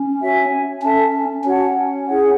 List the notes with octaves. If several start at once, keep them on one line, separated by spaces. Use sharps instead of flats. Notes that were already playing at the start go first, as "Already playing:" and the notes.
Already playing: C#4
F#4 C#5 E5 G#5
C#4 A4 E5 A5
C#4 F#4 C#5 F#5 A5
E4 G#4 C#5 F#5